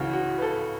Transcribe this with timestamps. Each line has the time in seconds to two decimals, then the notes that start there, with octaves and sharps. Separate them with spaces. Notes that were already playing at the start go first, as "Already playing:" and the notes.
Already playing: C#2 C#3 E3 F#4
0.13 F#4
0.38 B4
0.42 A4